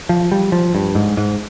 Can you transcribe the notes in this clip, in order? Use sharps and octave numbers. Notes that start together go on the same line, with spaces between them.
F3
G3
F3
G2
G#2
G#2